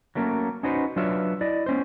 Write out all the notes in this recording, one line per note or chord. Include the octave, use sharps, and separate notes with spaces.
F#3 A3 A#3 C#4
C#4 D#4 F#4 B4 C5
F#3 D4 F4 B4 C#5 E5
E4 D5 D#5
B3 C#4 C5